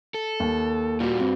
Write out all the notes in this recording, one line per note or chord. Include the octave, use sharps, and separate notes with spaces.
A4
D#2
A#2 G3 F4 F#4
G2 C4